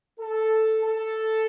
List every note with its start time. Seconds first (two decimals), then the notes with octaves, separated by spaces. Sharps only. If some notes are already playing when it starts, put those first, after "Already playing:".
0.19 A4
0.86 A4